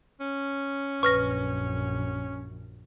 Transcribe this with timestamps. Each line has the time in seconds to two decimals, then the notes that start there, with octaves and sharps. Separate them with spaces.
0.20 C#4
1.03 A#1 F#2 B4 C#6 F6 A#6